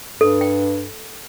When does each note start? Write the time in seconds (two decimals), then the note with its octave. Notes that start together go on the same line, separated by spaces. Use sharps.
0.21 G2 A4
0.41 G5